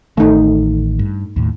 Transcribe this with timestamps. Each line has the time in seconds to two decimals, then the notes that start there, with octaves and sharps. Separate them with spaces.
0.17 A1 D#3 A3 D#4
0.99 G2
1.36 D#2 A2